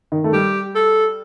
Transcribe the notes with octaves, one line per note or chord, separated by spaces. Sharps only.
D#3
A3
G3 G4
A4